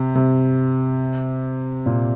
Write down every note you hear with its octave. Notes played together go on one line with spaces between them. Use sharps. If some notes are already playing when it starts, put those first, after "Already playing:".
Already playing: C3
C3
A#2